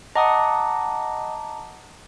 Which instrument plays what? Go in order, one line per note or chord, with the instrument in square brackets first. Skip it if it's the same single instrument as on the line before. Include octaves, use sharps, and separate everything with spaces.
[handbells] D#5 F#5 D#6 [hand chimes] A5 A#5 D6